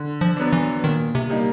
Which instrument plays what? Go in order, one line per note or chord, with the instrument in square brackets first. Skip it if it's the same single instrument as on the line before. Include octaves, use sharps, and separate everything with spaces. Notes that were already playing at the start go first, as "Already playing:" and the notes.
Already playing: [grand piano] D3
[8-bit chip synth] F3
[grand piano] F#3 B3 D4
[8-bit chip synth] E3
[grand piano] A#2 [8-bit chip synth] D#3
[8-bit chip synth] C3
[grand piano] G3 A#3 D#4